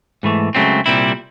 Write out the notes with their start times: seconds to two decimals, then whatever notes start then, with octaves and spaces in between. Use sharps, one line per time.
0.23 G#2 E3 A3
0.55 C#2 C#3 F#3 A3 C4
0.86 C2 A#2 G3 C4 E4